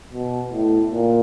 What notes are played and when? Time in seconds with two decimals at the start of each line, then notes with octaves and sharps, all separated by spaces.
0.13 B2
0.52 A2
0.92 A#2